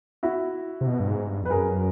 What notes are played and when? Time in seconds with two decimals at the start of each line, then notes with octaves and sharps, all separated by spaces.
0.23 E4 F#4
0.81 C3
0.87 B2
1.00 G2
1.08 G#2
1.29 G2
1.43 F2 B4
1.50 F#2 G#4 A#4